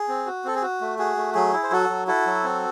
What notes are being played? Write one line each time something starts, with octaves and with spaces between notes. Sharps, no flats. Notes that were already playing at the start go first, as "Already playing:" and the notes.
Already playing: G#4
C4
F#4
C4 A4
G#4
F#4
A3
F#4 G#4
A3
F#3 G#4
E4
C5
F#3 F#4 A4
F#3
E4 F#4 A4
F#3
C4